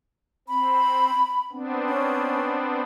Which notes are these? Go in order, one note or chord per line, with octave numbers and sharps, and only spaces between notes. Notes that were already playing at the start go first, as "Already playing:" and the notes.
C4 B5
B3 C4 D4
C#4